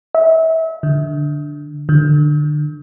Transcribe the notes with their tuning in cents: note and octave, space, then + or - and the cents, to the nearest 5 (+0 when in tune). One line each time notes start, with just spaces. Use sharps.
E5 -30
D3 +0
D3 +25